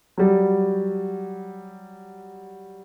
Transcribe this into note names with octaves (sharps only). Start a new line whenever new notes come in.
F#3 G3